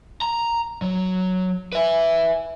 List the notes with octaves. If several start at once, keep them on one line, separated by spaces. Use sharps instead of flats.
A#5
F#3
B4 E5